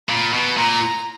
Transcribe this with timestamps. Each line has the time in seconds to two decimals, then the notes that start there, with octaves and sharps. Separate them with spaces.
0.09 A#2 B5
0.33 B2
0.57 A#2 A#5